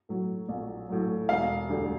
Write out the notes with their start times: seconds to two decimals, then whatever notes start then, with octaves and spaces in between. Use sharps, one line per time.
0.09 A2 F#3
0.49 A#1
0.89 A2 F#3
1.29 E1 F5
1.69 D2 D3 G3